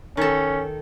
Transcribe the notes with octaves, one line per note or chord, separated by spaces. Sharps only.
D#3 C#4 A4